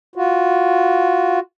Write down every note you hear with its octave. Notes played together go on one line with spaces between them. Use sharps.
F4 F#4